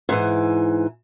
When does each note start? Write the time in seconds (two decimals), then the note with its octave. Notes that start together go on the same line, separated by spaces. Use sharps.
0.09 G#2 E3